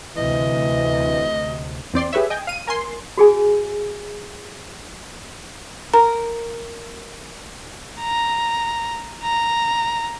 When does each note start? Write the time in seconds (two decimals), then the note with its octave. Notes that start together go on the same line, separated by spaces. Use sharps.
0.17 D2 C3 E3 D#5
1.94 E2 C4 D5 C6
2.13 G4 G#4 B4 C#5 E5
2.30 D#5 G5 G#5
2.47 F5 D#7
2.67 A#4 G#5 C6
3.18 F#4 G#4 G#5
5.94 A#4 A#5
8.01 A#5
9.23 A#5